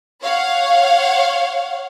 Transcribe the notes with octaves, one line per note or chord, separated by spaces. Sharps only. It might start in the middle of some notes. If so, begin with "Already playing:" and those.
C#5 F5 F#5